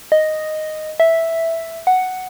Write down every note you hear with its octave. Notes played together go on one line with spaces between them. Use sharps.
D#5
E5
F#5